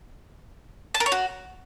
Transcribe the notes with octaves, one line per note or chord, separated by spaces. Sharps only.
A5
A#4
C#5
F#4